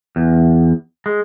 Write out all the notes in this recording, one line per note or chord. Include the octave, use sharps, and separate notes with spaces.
E2
G#3